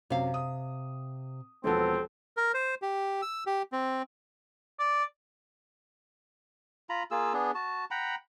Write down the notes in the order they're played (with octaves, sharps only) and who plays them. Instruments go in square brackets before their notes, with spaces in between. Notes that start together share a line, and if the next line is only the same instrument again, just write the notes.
[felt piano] F#2 [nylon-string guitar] C3 F5
[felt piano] D#6
[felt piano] E1 F3 B3 [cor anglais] C4 [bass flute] A4
[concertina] A#4
C5
G4
E6
G4
C4
[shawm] D5
[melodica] F4 A#5 B5
A#3 F4 G#4 E6
B3 D4 G#4
F#4 A5
F#5 G5 A#5 B5